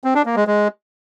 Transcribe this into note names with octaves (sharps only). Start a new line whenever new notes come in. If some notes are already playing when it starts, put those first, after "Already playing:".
C4
D4
A#3
G#3
G#3